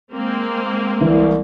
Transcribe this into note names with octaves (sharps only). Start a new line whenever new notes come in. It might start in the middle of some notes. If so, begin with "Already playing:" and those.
G#3 A#3 C4
C2 E3